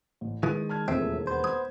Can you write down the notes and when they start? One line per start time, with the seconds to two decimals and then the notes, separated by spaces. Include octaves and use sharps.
0.21 A1
0.43 D#3 E3 G#3 D#6
0.69 A5 F6 G#6
0.88 E1 D#2 A2 F3 C4 G#4 E5
1.27 B3 C5
1.44 D#6 G#6